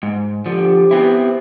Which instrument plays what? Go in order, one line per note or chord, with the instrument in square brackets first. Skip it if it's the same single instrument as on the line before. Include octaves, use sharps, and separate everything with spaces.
[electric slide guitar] G#2
[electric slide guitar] D3 F3 [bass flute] G4
[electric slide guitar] B3 C4 E4